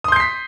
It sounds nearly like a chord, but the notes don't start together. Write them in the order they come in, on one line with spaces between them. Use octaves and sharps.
D#6 C6 G6 C7 B6